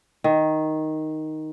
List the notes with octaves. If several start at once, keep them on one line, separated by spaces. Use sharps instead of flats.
D#3